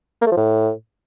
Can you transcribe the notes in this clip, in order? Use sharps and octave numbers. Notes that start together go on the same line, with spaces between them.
A#3
A3
F3
A2